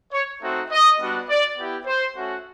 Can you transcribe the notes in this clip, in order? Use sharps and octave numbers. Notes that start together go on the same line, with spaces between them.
C#5
A3 C4 D#4 F#4
D#5
G3 B3 D4 F#4
D5
B3 E4 G4
C5
A3 C#4 F#4